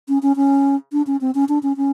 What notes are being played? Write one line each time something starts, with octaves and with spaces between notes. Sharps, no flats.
C#4
C#4
C#4
D4
C#4
C4
C#4
D4
C#4
C#4